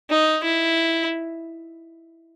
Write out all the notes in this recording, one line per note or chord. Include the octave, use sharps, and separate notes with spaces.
D#4
E4